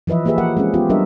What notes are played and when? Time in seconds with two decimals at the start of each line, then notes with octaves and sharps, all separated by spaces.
0.07 E3 F3 B4 D#5 E5
0.25 A#3 G4 G#4 B4 E5
0.38 F3 A#4 F#5
0.57 G#3 C4 C#4 G#4
0.74 B3 C#4 F4 G4
0.89 F#3 G3 D4 A#4 D#5 E5